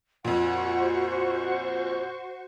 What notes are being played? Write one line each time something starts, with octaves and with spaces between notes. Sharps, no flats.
F2 A#2 F#4 C5 F#5 C#6